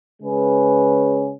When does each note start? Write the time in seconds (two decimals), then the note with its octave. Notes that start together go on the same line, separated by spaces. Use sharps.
0.22 C#3 G#3 C#4 G#4 B4